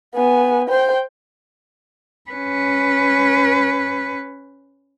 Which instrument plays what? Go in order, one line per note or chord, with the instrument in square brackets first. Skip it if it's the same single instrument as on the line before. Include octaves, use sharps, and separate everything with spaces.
[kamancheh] B3 G#5
C5 G5
[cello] C#4 B4